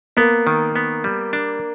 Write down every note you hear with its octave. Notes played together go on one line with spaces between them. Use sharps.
A#3 B3
D#3
B3
G3
D4